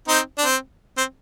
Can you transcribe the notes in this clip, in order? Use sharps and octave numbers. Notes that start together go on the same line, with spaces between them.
C4 D#4
D4
C4
C4